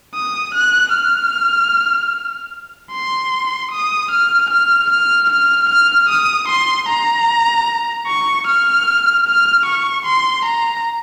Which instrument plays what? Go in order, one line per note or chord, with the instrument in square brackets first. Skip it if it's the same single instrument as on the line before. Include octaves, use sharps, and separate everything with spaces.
[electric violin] D#6
F#6
F6
C6
D#6
F6
F6
F6
F6
F6
D#6
C6
A#5
C#6
F6
F6
C#6
C6
A#5